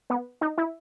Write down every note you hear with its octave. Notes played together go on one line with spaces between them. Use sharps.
B3
D#4
E4